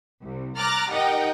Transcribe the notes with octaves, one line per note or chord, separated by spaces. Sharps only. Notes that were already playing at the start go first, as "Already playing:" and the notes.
C2
A#5 D6 F6 F#6 A6
D#4 G4 A#4 D#5 F#5 G5